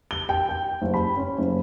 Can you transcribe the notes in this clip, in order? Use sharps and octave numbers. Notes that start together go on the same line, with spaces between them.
G7
G5
G5
F#1
B5
C#4
F#1